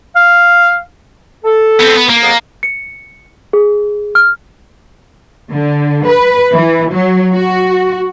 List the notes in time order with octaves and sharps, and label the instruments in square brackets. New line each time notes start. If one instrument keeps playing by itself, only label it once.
[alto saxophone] F5
[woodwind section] A4
[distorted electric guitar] B3 C4
B3
A#3
[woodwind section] F2 B3 G#4
[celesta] C#7
G#4
F6
[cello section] D3
B4
E3
F#3
F#4